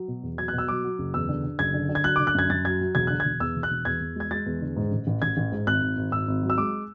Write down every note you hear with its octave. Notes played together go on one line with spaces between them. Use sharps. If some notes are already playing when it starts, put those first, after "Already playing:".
Already playing: F#3
B2
E2
F#3 G#6
B2 F#6
E6
F#3 D6
F#3
F#1
E2 E6
D3
D3
F#1 G#6
D3
D3
G#6
F#3 F#6
D3 D6
F#6
F#2 G#6
F#2 A6
F#3 G#6
F#3
E1 G#6
D3 F#6
G#6
E1
E2 E6
E1
F#6
E1
E2 G#6
E2
G#3 G#6
G#3 A6
E2
D3
G#2
A1
A1
A1 G#6
A1
G#2
G#1 F#6
G#1
G#1
G#1 E6
G#1
F#3
E6
G#3 D6